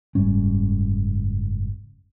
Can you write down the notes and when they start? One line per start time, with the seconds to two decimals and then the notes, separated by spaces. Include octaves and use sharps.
0.15 F#1 G#2 G3 C#4